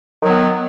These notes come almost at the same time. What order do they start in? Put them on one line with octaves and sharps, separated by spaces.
D#3 F#3 B3